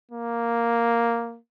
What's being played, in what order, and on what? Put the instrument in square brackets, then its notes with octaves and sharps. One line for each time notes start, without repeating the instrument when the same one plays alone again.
[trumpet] A#3